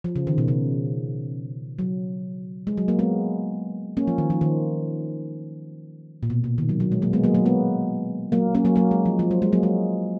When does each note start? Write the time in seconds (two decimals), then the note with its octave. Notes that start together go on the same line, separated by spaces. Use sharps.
0.04 F3
0.16 C#3
0.27 D#3
0.38 B2
0.48 C#3
1.79 F#3
2.67 G#3
2.77 F#3
2.88 F#3 A#3
2.99 G#3 B3
3.97 A#3 C#4
4.07 F3
4.18 D#3
4.30 F3
4.41 D#3
6.23 A#2
6.30 B2
6.44 B2
6.58 D#3
6.69 F#3
6.80 F#3
6.92 G#3
7.02 F#3 A#3
7.13 G#3 B3
7.24 F#3 A#3
7.34 F#3 A#3
7.45 G#3 B3
8.32 F#3 A#3
8.55 A#3 C#4
8.65 F#3 A#3
8.76 F#3 A#3
8.91 G#3
9.05 F3
9.19 F3
9.31 F#3
9.42 G#3
9.52 F#3 A#3
9.63 G#3